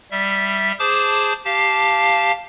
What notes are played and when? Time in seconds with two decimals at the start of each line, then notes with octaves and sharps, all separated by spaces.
0.11 G3 E5
0.79 G#4 C5 A5 D6
1.45 G4 F5 A5